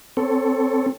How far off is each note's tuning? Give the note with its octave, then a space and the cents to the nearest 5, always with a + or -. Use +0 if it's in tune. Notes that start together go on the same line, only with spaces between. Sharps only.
C4 +0 A4 +0 C#5 +0